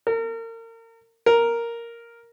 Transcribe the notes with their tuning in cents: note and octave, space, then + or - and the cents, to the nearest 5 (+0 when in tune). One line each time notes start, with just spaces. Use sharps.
A#4 -35
A#4 +0